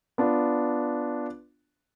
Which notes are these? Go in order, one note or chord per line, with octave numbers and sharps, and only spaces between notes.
B3 D4 F4